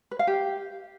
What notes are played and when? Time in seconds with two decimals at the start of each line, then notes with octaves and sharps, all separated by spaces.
0.11 B4
0.19 F5
0.27 G4